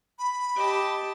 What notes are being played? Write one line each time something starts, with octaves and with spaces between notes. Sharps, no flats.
B5
G4 D#5 A5